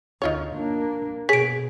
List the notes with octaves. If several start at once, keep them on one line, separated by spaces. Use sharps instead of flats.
D2 D#4 F4 C#5
A#3 D4
B2 G#4 C#5 B6 D7